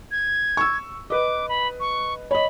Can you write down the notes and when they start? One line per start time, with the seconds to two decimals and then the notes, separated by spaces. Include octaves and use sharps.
0.11 G#6
0.57 C#6 E6
1.10 B4 D#5 D6
1.49 B5
1.80 C#6
2.31 C#5 D#5 B5